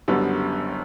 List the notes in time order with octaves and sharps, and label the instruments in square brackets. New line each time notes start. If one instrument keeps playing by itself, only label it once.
[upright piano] F#1 F#2 D3 G3 B3